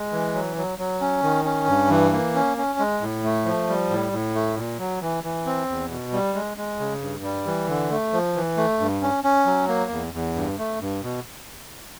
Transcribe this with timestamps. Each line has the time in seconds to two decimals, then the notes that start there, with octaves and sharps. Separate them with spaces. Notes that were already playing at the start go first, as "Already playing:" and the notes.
Already playing: G#3
0.12 E3
0.34 F#3
0.56 F#3
0.79 F#3
1.01 C#4
1.23 D#3
1.45 C#4
1.68 G2
1.90 E3
2.12 A#3
2.35 C#4
2.57 C#4
2.79 G#3
3.01 A2
3.24 A3
3.45 F3
3.69 G3
3.90 A2
4.12 A2
4.35 A3
4.57 A#2
4.79 F#3
5.01 E3
5.24 E3
5.46 C4
5.69 E2
5.90 B2
6.13 G3
6.35 G#3
6.57 G#3
6.80 C#3
7.02 G2
7.24 G3
7.46 E3
7.68 D3
7.90 A3
8.13 F3
8.36 E3
8.57 A3
8.80 G2
9.02 C#4
9.24 C#4
9.46 F#3
9.68 A#3
9.91 E2
10.13 E2
10.35 G2
10.58 A3
10.80 G2
11.03 B2